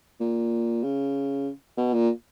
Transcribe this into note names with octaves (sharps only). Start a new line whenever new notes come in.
A#2
C#3
B2
A#2